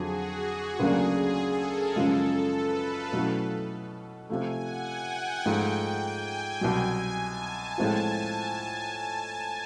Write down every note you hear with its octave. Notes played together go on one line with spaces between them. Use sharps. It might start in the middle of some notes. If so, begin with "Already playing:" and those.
Already playing: F2 D3 F#3 F#4 G#4
F#4
D2 C#3 F#3 A#3 D4 G#4
A4
A#4
F#2 C#3 F3 G#3 A4
B4
F5
B2 F#3 A3 C#4 E4
C3 F3 A3 G#5
F#5
G5
G#2 F3 A3
G#5
C2 B2 F#3
A5
A2 F3 G#3 C4 F4